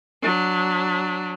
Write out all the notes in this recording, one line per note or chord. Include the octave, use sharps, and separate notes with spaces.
F#3 D4